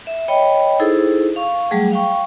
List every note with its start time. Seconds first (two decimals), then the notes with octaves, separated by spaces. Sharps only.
0.07 E5
0.28 C#5 D#5 G5 B5
0.79 D#4 E4 G#4 A4 C5
1.36 F5 C#6
1.71 F#3 G3 A3 G#4
1.91 F5 G5 C#6